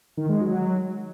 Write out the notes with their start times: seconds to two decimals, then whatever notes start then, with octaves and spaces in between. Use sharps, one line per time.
0.17 D#3
0.29 G#3
0.41 F#3